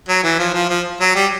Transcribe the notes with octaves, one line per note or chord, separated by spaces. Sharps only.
F#3
E3
F3
F3
F3
F#3
G3